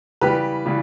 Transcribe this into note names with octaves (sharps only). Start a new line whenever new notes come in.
C#3 E3 G3 G4 B4
C#3 E3 G3